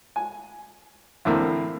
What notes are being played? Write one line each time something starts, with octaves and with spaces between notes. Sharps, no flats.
G#5
E2 A2 D3 A#3 C4